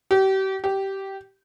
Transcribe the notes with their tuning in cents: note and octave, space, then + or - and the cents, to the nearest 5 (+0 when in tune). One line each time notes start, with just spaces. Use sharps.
G4 -35
G4 -15